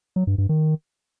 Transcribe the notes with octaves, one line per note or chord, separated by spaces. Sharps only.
F#3
G2
G2
D#3